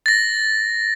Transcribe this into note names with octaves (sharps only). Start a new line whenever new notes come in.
A6 A#6